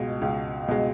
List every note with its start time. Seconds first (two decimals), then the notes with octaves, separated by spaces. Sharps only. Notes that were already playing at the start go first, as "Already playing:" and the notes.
Already playing: C#2 B2 G#3
0.22 C#2
0.68 B2 G#3